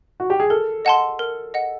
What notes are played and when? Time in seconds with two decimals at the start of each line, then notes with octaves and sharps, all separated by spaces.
0.20 F#4
0.30 G4
0.40 G#4
0.50 A4 A#4
0.85 D#5 F#5 A5 C6
1.19 A#4
1.54 D#5 F#5